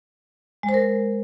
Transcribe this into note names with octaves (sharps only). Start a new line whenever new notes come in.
G#3
C5
A#4